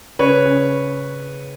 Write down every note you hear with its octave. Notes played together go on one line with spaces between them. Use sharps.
C#3 B4 C#5
C#3